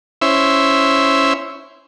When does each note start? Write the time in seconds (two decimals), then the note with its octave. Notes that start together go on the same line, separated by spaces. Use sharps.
0.22 C#4 E4 C5 E5